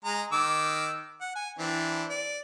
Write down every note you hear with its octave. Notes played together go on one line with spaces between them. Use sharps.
G#3 A#5
D#3 D6 E6
F#5
G#5
E3 C4 D4
D5